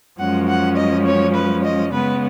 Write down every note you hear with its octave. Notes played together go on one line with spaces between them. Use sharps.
F#2 F3 G#3 C#4 F#5
F#5
D#5
C#5
B4
D#5
C#3 G#3 B3 B4